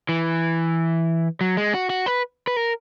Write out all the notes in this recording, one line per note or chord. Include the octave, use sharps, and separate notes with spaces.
E3
F#3
G#3
F#4
F#4
B4
B4
A#4